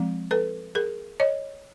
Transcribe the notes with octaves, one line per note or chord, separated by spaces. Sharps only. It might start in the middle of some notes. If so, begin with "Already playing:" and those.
Already playing: F3 G#3 C4
A4 B4
G#4 A#4
C#5 D#5